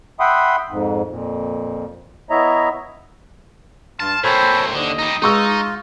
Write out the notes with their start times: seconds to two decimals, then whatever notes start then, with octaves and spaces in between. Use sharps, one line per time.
0.20 E5 F#5 G5 B5 C6 D#6
0.69 F2 G#2
1.10 F2 A#2
2.30 B3 E4 C#5 D#5 E5 A#5
4.00 G2 F4 A5
4.24 A#2 C4 A4 C5 C#5 B5
4.74 D#2 D3 D#5
4.99 G3 D#4
5.22 G#3 D#4 F4 C#6 E6